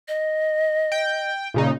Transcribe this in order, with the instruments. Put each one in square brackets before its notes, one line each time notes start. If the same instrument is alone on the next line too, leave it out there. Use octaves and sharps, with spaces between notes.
[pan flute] D#5
[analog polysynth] G5
A#2 C#3 D#4